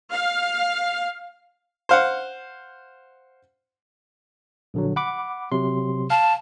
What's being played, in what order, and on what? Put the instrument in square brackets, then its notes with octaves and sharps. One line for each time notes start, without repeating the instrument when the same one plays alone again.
[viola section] F5
[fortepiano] C5 F5 F#5
[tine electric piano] A#1 D3 F#3
F#5 B5 D6
C3 F#3 C6
[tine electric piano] F5 [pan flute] A5